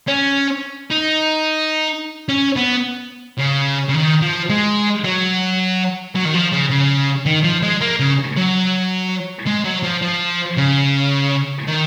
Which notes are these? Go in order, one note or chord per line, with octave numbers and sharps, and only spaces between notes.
C#4
D#4
C#4
B3
C#3
C#3
D#3
F3
G#3
F#3
F#3
D#3
F3
C#3
C#3
D#3
F3
G#3
A#3
C#3
F#3
G#3
F#3
F3
F3
C#3
D#3